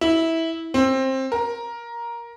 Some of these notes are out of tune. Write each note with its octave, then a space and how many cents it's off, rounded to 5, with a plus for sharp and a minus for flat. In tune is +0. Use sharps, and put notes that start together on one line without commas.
E4 -15
C4 +20
A#4 +10